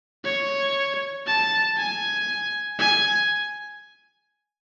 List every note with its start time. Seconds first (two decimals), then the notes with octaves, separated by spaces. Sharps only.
0.24 C#5
1.27 A5
1.77 G#5
2.79 G#5